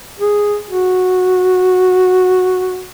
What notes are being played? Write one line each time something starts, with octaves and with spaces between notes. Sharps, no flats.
G#4
F#4